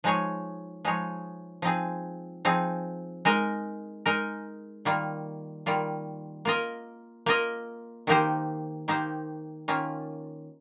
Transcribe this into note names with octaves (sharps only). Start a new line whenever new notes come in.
F3 G#3 D#4 G#4 C#5
F3 G#3 D#4 G#4 C#5
F3 C4 D#4 G#4
F3 C4 D#4 G#4
G#3 D#4 A#4 D#5
G#3 D#4 A#4 D#5
D#3 G3 A#3 F4
D#3 G3 A#3 F4
A#3 F4 A#4 D#5
A#3 F4 A#4 D#5
D#3 A#3 D#4 G4 C5
D#3 A#3 D#4 G4 C5
D#3 A#3 C#4 F4